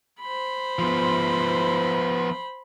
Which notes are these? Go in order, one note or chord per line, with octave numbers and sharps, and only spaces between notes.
C5 B5
F3 B3